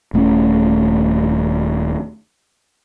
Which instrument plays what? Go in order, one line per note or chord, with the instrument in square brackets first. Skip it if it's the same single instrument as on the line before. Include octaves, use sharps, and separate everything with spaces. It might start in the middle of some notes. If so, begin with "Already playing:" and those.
[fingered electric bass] D#1 A3 A#3 C#4